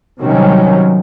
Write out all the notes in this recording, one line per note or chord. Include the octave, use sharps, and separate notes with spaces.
C3 D#3 F#3 G3 C#4